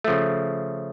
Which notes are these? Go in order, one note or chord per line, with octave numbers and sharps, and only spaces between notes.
C#3 F3 A3